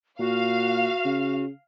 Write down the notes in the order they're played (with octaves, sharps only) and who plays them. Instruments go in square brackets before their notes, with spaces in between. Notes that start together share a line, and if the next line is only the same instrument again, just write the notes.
[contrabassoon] A#2 [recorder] F#4 [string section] F5
[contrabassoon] C#3